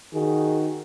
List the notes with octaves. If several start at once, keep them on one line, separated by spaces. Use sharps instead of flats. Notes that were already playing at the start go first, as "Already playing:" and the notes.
D#3 F#4 G#4